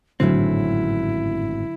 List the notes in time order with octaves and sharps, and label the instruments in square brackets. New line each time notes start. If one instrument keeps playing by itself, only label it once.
[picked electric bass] G#1 F#2 C4 [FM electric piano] A2 [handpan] D3 F#3 [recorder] E4